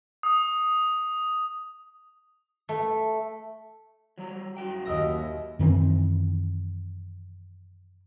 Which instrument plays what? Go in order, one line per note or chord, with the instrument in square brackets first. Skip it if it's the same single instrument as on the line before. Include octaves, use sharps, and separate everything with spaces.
[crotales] D#6
[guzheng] A3
[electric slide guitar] F#3 G3 A#5
F#2 F#4 G5
[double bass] D#2 [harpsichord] D#5 E5 A#5
[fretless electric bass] F#2 D#3 E3 C4